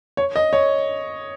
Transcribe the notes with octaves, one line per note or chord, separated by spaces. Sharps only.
C#5
D#5
C#5